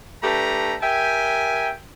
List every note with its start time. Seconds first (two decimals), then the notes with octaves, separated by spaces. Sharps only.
0.23 A3 D4 G4 B4 A#5
0.81 G4 A#4 E5 G5 G#5